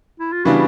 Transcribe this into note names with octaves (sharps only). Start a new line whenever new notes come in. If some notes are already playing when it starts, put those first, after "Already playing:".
E4
F4
C#3 E3 G3 B3 D4 F#4